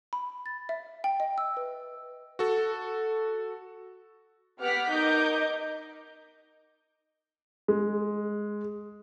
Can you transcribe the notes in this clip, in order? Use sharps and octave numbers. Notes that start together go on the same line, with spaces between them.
B5
A6
E5
G5
D#5
E6
B4
F#4 A4
B3 G4 F#5 D6 F6 B6
D#4 A#4 D#5 D6 G6
G#3